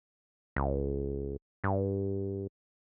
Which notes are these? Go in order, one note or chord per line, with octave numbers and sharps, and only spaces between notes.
C#2
G2